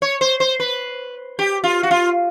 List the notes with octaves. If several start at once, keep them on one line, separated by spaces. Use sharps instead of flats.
C#5
C5
C5
B4
G4
F4
F#4
F4